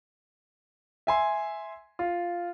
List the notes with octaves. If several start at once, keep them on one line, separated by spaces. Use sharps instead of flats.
E5 G#5 C6
F4